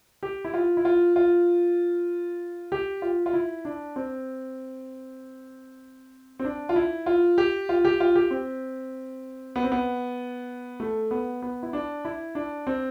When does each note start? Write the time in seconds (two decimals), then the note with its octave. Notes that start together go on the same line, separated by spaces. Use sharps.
0.23 G4
0.45 E4
0.54 F4
0.77 E4
0.85 F4
1.16 F4
2.72 G4
3.02 F4
3.26 F4
3.33 E4
3.65 D4
3.96 C4
6.39 C4
6.45 D4
6.69 F4
6.76 E4
7.06 F4
7.38 G4
7.69 F4
7.85 G4
8.00 F4
8.16 G4
8.31 C4
9.56 B3
9.63 C4
9.72 B3
10.80 A3
11.11 B3
11.42 B3
11.63 E4
11.73 D4
12.05 E4
12.35 D4
12.67 C4